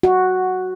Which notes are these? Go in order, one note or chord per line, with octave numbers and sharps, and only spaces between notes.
F#4